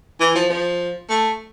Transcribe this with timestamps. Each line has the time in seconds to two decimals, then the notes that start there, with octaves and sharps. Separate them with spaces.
0.20 E3
0.35 F3
0.49 F3
1.10 A3